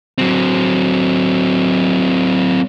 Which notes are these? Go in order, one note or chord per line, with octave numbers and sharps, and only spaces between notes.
F#3 C4